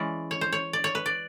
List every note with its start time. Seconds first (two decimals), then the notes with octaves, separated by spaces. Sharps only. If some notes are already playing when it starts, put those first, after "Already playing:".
Already playing: E3 G#3 C#4 D5
0.31 C#5
0.41 C5
0.52 C#5
0.73 D5
0.84 C#5
0.95 B4
1.06 D5